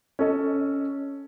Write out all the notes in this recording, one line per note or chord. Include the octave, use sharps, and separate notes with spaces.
C#4 A4 D#5